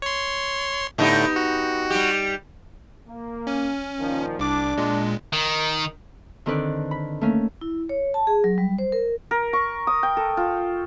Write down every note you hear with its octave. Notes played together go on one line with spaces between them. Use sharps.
C#5 C6
A2 D3 A3 B3 D#4 G4
F#4
G3 G4
A#3
C#4
A#2 D#3 F3
C2 D4 D6
A#2 G#3
D#3
D3 D#3 C4 A4 B4 D5
B5
A3 A#3 C#4
E4
C#5
A5
G#4
F#3
G3
C5
A#4
A#4
C#6
D#6
G5
A4
F4